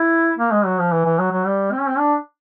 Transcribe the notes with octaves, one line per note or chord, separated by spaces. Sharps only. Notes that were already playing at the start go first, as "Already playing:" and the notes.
Already playing: E4
A#3
G#3
F#3
F3
E3
E3
F#3
F#3
G3
C4
C#4
C4
D4